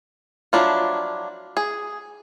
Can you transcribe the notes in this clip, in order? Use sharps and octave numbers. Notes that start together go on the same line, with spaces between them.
F3 F#3 D4 E4 F4
G#4